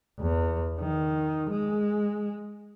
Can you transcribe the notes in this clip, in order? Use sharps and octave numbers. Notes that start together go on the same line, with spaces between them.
E2
D#3
G#3